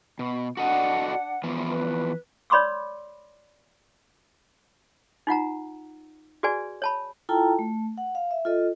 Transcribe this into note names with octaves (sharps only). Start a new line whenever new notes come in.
B2
D4 F#4 A4 D#5 F#5
E3 F3 B3
B4
C#5 D5 B5 C6 D6 E6
D#4 F4 F#5 A#5
F#4 G#4 B4 D5 G#5
C#5 A5 B5
E4 F4 A4 G5 A5 A#5
A3
F#5
F5
E5
F4 A4 D#5